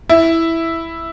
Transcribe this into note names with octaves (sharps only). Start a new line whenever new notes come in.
E4